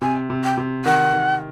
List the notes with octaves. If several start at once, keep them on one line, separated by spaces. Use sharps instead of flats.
C3 G#5
C3
G5
C3
D#3 F#5
D#3